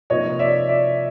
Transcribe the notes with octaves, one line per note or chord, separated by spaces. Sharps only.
C3 F3 A#3 D#4 C#5 D#5
D5 E5
D5 E5